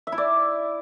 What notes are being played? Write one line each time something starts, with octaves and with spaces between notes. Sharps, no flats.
E5
E4
D5